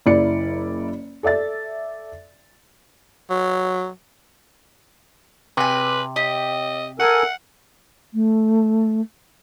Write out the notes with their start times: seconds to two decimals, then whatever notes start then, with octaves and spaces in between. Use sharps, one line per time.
0.06 F#1 E4 D5 C#7
1.23 A4 D5 E5 A6
3.30 F#3
5.57 C3 B4 G5 G#5
6.16 G4 D#5
7.00 A4 A#4 F#5 G#5
8.14 A3